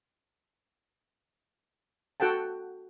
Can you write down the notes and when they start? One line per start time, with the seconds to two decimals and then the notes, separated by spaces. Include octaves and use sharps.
2.20 F#4 A4 F#5 G5 A5